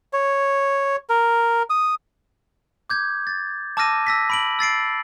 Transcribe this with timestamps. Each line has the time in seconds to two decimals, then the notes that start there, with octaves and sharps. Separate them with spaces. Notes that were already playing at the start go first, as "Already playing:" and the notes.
0.13 C#5
1.09 A#4
1.70 D#6
2.90 D6 G6 G#6
3.27 A6
3.77 A5 D6 E6 F6 A#6 D#7
4.07 E6 A#6 B6
4.30 B5 D7 F#7
4.59 E6 A6 C7 D7